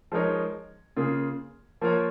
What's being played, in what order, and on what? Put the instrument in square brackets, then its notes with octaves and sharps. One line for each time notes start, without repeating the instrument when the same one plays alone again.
[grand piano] F3 G#3 D#4 A#4 C#5
C#3 A#3 F4 G#4
F3 A#3 F4 A#4 C#5